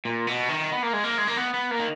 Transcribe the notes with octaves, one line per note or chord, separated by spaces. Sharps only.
A#2
B2
D#3
B3
A#3
G#3
A#3
G#3
A#3
B3
B3
A#3
D#3